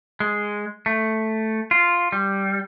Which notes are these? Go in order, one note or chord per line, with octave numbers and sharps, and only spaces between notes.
G#3
A3
F4
G3